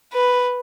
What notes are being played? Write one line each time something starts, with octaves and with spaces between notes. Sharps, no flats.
B4